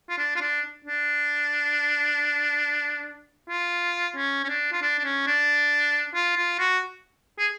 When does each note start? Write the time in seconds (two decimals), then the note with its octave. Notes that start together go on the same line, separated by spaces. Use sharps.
0.09 F4
0.18 D4
0.36 F4
0.41 D4
0.85 D4
3.50 F4
4.16 C#4
4.44 C#4
4.49 D4
4.73 F4
4.82 D4
4.99 D4
5.05 C#4
5.27 D4
6.15 F4
6.37 F4
6.59 F#4
7.39 G#4